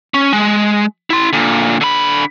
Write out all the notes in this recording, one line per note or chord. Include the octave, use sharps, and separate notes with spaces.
C#4
G#3
E4 C6
A#2 D3
D3 B5